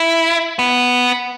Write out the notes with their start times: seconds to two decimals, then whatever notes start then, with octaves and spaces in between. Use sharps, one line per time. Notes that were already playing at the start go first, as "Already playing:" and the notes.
Already playing: E4
0.59 B3